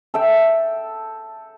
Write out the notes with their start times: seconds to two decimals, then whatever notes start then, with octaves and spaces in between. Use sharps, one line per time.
0.14 A4 E5 G5